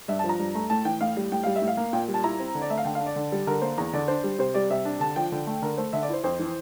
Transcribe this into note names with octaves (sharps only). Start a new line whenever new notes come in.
G2 E5
A5
F3
A#5
G2
A3
A2 A5
E3 G5
A2 F5
G3
A2 G5
G3 F5
E5
A2
F5
A#3
A#2 G5
G3
A5
E4 A#5
C4
D3
D5
A3 E5
F5
D3 G5
F5
D4
D5
D3
G3
D3 A#4
A#3 C5
E2 A#5
D3 D5
D4 C5
G3
C3 C5
G3 D5
C3 E5
D4
D3 A5
F3 G5
D3
A3
D3 A#4
A3 C5
D3 E5
D5
E4 C5
F2 C5
E3